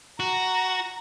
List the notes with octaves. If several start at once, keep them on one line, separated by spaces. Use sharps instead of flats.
F#4 A#5